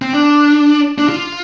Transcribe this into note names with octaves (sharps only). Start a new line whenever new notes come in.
C4
D4
D4
F4